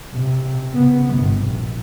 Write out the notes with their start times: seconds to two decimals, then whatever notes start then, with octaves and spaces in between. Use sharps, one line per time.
0.12 C3
0.74 C#3 B3
1.11 G1 C3
1.43 A#1